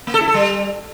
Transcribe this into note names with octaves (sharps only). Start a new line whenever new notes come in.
A#3
A4
E4
A4
G3